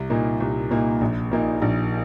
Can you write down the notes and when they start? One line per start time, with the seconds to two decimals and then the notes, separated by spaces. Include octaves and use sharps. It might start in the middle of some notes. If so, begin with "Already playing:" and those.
Already playing: C2
0.10 A#2 A#3 D#4
0.40 C2
0.71 A#2 A#3 D#4
1.01 A#1
1.31 A#2 A#3 D#4
1.62 A#1